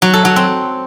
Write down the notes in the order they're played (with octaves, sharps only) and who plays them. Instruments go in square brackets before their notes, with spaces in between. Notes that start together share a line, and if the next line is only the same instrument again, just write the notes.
[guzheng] F#3
A4
F#3
C4